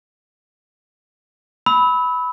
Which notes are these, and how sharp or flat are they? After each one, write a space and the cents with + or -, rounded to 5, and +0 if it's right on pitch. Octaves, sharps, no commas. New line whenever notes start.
B5 +5 E6 -30